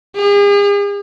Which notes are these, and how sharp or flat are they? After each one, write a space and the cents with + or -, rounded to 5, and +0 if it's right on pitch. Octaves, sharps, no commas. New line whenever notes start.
G#4 -45